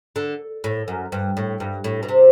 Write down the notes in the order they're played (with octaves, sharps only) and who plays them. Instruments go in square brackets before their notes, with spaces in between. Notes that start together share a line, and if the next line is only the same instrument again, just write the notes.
[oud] D3
A2
F#2
G2
A2
G2
A2
B2
C3